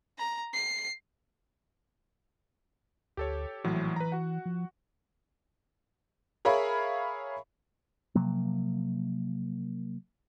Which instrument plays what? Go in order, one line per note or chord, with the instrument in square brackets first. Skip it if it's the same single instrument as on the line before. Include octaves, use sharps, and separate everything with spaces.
[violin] A#5
C7
[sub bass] D2 [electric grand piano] G4 A4 C#5
[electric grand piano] A#1 A2 F#3 [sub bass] E3
[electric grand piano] B4 A#5
F#4 F#5
[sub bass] F3
[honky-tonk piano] G#4 A#4 C#5 E5 F5 B5
[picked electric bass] C3 F3 F#3 A#3